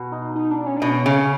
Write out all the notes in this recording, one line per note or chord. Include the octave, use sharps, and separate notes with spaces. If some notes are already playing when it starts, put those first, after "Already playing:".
Already playing: B2
D#4
D#4
D4
C#4
B2 D4
C#4
C#3